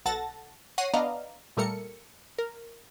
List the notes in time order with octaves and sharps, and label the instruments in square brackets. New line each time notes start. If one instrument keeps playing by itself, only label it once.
[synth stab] B1 A4 F#5 A5 A6 A#6
C#5 F#5 A#6 C7 D#7
B3 D4 D5 D#5 F5 A#5
A#2 G3 A3 A4 A#4 C#7
A#4